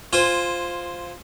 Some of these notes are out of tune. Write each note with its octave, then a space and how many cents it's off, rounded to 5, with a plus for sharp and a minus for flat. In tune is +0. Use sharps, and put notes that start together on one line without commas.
F4 +5 C5 -5 G#5 -15